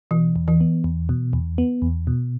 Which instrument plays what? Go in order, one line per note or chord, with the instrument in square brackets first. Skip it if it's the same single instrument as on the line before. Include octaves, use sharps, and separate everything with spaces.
[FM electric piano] B2 [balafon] E3
[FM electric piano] E2
[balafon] E3
[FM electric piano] B3
E2
B2
E2
B3
E2
B2